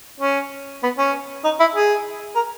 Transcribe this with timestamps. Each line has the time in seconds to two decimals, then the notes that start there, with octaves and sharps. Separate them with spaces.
0.21 C#4
0.83 B3
0.98 C#4
1.44 D#4
1.60 E4
1.75 G#4
2.36 A#4